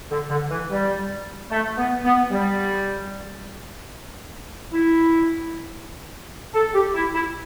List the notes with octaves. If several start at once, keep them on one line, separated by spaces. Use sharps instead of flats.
D3
D3
E3
G3
A3
B3
B3
G3
E4
A4
G4
E4
E4